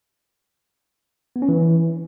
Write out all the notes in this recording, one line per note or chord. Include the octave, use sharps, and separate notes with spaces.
B3
C#4
E3